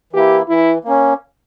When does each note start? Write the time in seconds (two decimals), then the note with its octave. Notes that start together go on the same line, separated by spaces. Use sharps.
0.13 E3 A#3 E4 G4
0.48 E3 E4
0.85 A#3 C#4